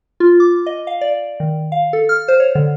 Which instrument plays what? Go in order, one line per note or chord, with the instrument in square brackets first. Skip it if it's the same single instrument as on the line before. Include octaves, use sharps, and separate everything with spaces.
[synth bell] F4
D6
D#5
F5
D5
D#3
F5
A4
F6
C5
C#5
D3